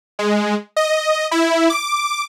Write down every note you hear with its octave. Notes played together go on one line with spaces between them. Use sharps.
G#3
D#5
E4
D6